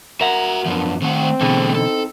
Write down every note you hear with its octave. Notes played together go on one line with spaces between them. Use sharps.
F#4 A#4 E5 F#5
F#2 A#2 F3 B3 D4
D#3 A3 C4 F#5
B2 D3 E3 A3 G#4
E2 C4 D#4 A4